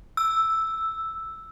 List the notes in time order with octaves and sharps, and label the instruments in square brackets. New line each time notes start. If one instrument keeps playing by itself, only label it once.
[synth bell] E6